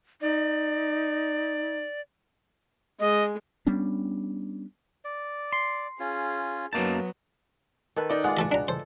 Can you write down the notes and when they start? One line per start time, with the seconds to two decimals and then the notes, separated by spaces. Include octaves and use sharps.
0.22 D#4 D5
3.00 G#3 D#5
3.67 G3 B3 C#4 D4
5.05 D5
5.53 C6
6.00 C#4 F4 G#4
6.73 F#2 F#3 A#3 B3 D#4 A5
7.96 D#3 A4 B4
8.09 D#4 D5
8.24 G#3 F4 D5 F#5
8.37 A3 A4 D#5
8.52 D4 A#5
8.68 A4 C5